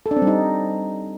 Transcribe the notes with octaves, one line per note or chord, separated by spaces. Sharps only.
A4
D4
C4
G3
D#4